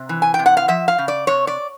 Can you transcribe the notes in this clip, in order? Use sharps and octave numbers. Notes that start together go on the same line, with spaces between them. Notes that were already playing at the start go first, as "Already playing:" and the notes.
Already playing: C3
E3
G#5
G5
C3
F#5
F5
F3 E5
F5
C#3
D5
C3 C#5
D5